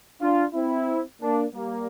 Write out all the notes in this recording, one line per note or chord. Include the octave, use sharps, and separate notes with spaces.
D4 F4
C4 E4
A#3 D4
G3 A#3